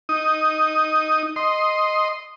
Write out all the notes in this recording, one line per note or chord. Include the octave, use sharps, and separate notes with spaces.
D#4 D#6
D#5 C6